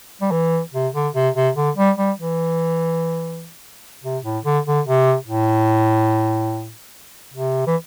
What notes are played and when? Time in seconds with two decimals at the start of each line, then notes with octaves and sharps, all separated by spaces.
0.21 G3
0.31 E3
0.73 C3
0.94 D3
1.15 C3
1.35 C3
1.56 D3
1.77 G3
1.97 G3
2.18 E3
4.04 C3
4.24 A2
4.45 D3
4.66 D3
4.86 C3
5.28 A2
7.34 C3
7.67 E3